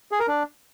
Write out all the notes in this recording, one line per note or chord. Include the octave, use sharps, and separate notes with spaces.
G#4
A#4
D4